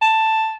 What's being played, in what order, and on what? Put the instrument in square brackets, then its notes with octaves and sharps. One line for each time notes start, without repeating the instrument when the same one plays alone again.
[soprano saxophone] A5